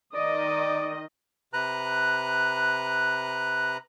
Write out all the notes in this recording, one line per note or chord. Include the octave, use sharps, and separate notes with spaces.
D#3 D5 D#5
C3 B4 A#5 F#6